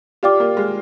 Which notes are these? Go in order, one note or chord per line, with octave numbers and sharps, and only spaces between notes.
F4 G4 D5 G5 D6
A#3
G#3